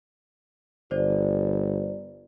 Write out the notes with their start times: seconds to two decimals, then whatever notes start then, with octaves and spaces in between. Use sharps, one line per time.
0.91 G1 C5 D5